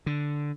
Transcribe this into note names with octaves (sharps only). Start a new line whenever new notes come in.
D3